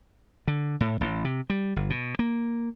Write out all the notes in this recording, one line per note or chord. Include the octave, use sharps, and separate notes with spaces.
D3
A2
A1
C3
G3
G1
B2
A#3